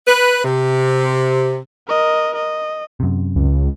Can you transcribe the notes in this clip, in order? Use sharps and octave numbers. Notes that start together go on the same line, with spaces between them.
B4
C3
A#4 D#5
D#5
F#2 C3
C#2